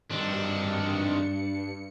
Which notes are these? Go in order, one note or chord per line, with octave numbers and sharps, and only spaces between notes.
G2 D#3 C4 D4 C#7